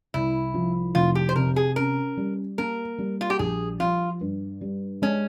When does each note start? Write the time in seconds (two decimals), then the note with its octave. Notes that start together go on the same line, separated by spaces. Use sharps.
0.14 C2 E4
0.54 F3
0.95 F1 F4
1.15 G4
1.29 C5
1.36 C3 A#4
1.56 G#4
1.76 C#4 A#4
2.17 G3
2.58 A#3 A#4
2.98 G3
3.21 F4
3.30 G4
3.39 A#1 G#4
3.80 F3 F4
4.21 G2
4.61 G3
5.02 G#3 C#4